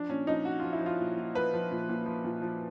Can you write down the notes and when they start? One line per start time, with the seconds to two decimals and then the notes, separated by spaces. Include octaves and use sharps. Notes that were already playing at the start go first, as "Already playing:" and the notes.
Already playing: F3 D4
0.09 A#2 C#4
0.27 F3 D#4
0.45 F3 F#4
0.60 F3 F4
0.73 E4
0.81 F3
0.86 F4
1.00 A#2
1.17 A#2
1.34 F3 B4
1.54 F3
1.71 A#2
1.89 A#2
2.06 F3
2.25 A#2
2.42 F3